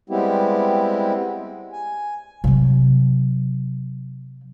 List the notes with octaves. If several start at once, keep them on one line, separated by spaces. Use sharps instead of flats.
G3 G#3 B3 C4 E4 G4
G#5
C3 F#3